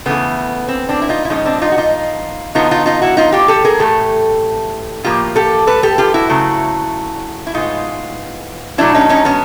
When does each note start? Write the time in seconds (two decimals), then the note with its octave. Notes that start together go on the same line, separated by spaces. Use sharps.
0.06 C#3 E3 A3 B3
0.68 C4
0.89 C4 D4
1.02 E4
1.09 D#4 F4
1.25 E4
1.30 A#2 F3 G#3 B3 C#4 D#4
1.45 C4 D4
1.61 D#4 F4
1.72 F#4
1.77 D#4 F4
2.55 D3 F#3 B3 D#4 F4
2.71 D#4 F4
2.86 D#4 F4
3.02 E4 F#4
3.17 D#4 F4
3.32 F4 G4
3.48 G4 A4
3.65 G#4 A#4
3.79 A2 E3 A3 G4 A4
5.04 A2 F3 A#3 F4 G4
5.36 G4 A4
5.67 A4 B4
5.83 G4 A4
5.98 F4 G4
6.14 E4 F#4
6.29 C#3 F#3 A3
7.47 E4
7.54 A2 E3 G#3 B3 D#4 F4
8.78 B2 F#3 A3 D4 E4
8.94 C#4 D#4
9.09 C#4 D#4
9.25 B3 C#4